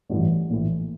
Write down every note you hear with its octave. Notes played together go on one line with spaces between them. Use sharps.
A1 G2 E3
A#1 A2 E3